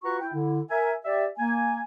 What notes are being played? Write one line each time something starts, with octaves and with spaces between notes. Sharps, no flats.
F4 F#4 B4 F#5 A#5 C#6
E4 G5
D3 E4
A#4 E5 G#5
G4 D5 E5
A#3 G#5